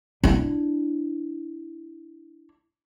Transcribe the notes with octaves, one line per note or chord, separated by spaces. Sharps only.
D4 E4